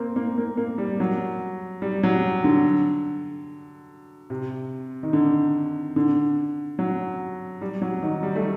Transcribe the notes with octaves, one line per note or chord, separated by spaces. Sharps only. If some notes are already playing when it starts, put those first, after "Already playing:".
Already playing: A#3 C4
A#3
A#3
A#3
G3
F#3
G3
F#3
D3
C3
D#3
D3
D3
F#3
G3
F#3
D#3
G3
A3